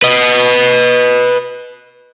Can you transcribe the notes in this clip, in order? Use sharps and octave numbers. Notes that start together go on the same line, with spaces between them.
B4 D#5